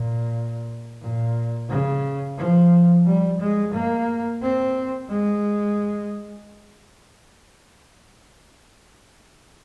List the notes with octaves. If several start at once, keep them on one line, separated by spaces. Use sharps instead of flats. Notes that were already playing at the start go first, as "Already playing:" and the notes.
Already playing: A#2
A#2
C#3
F3
G3
G#3
A#3
C4
G#3